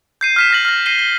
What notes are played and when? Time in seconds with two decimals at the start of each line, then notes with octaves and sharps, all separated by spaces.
0.21 G6 C7 D#7
0.36 F6 B6 E7
0.51 F6 A#6 F#7
0.65 F6 A#6
0.86 A#6 C7 D#7 G7
0.99 G7